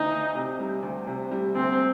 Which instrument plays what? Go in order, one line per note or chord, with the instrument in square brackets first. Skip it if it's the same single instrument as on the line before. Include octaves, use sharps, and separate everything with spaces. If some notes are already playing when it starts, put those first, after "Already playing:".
Already playing: [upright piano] D2 D4 [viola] D#4
[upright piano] D2
C3
G3
D2
C3
G3
[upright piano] D2 [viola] C4